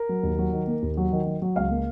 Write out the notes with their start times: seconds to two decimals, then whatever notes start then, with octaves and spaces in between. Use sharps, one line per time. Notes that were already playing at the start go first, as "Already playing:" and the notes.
Already playing: A#4
0.09 F#3
0.23 D#2
0.39 F#3
0.53 D#3
0.67 A#3
0.82 D#2
0.97 F#3
1.12 D#3
1.27 F#3
1.42 F#3
1.56 C#2 F5
1.70 A#3